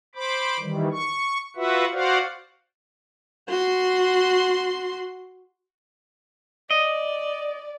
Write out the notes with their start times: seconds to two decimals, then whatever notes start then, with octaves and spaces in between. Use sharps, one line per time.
0.15 C5 B5 D6
0.60 D#3 E3 G3
0.92 C#6
1.56 F4 F#4 B4 E5 F#5
1.92 F#4 C5 D5 F5 F#5
3.48 F#4 C6
6.71 D5 D#5